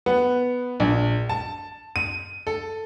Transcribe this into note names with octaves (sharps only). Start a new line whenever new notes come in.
B3
A#1
A5
D#7
A4